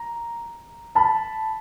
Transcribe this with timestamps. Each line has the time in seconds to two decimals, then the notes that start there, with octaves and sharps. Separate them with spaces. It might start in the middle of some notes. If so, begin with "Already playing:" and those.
Already playing: A#5
0.95 A5 B5